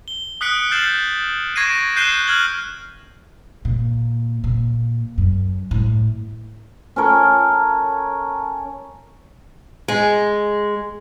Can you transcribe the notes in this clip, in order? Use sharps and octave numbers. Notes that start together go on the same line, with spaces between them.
G7
D#6 F#6 B6 C#7 D7
F6 G6 A6 C7 E7 F#7
C#6 G#6 A#6 C7 D7 D#7
F#6 G6 C7 D#7 E7 G7
F6 F#6 G#6 F#7 G7
A#2
A#2
F#2
A2
C#4 A4 A#4 C#5
G#3